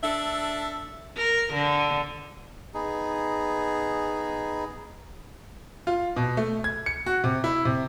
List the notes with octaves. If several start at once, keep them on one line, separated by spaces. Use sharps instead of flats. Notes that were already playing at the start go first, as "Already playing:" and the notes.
D4 A4 E5
A#4
D3
B3 D#4 G#4
F4
B2
A3
G#6
C#7
F#4
C3
E4
C3